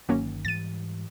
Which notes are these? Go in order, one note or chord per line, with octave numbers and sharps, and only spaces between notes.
G1 D#3 F#3 A#3 C#4
G#2 E3 G3 A6 D#7